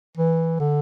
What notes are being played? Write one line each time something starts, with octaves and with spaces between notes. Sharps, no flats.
E3
D3